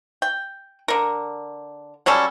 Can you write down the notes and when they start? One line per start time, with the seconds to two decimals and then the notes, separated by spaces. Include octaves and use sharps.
0.22 G5
0.88 D3 A#4
2.06 F#3 G3 C#4 A4